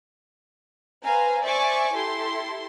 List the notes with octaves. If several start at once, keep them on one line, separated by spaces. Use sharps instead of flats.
B4 C5 F5 G#5 A#5
C5 D5 E5 G#5 C#6 D6
E4 G4 A4 C6